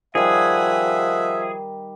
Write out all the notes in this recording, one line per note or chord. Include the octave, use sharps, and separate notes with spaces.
D#3 F3 G3 G#4 E5 F#5